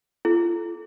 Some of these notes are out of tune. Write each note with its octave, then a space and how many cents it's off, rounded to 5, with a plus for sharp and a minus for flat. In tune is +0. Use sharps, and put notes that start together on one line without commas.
F4 -35 A4 -25